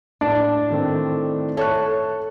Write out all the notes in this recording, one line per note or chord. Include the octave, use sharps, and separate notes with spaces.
A2 D4
D#3 A3 C4
A4 C#5 E5 A5 C#6 F#6